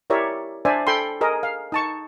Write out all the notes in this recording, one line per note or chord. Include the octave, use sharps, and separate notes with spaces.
E4 G4 A#4 C#5 D5 E5
D4 C5 D5 E5 G#5
A4 G5 B5 C6
G#4 A#4 D#5
F5
D#4 A5 C#6